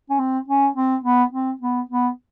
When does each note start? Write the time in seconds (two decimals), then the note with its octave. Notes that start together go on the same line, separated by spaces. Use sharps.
0.10 C#4
0.19 C4
0.48 C#4
0.76 C4
1.04 B3
1.33 C4
1.61 B3
1.90 B3